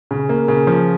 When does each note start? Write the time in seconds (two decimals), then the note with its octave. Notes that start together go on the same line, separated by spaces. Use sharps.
0.11 C#3
0.29 A#3
0.48 C#3
0.67 F3